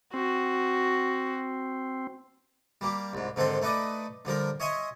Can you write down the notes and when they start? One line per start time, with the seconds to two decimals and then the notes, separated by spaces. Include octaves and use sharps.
0.14 C4 F#4
2.81 G3 A#3 G4
3.13 C2 G#2
3.36 G#2 D3 D#3 C4 A4 C6
3.62 A3 D#4 B4 D5 D#5
4.25 D3 F3 G3 A#4
4.60 C#5 D#5 E5 G#5 C6 C#6